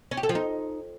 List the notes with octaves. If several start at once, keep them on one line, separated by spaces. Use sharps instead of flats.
C#4
G4
A4
F3
D#4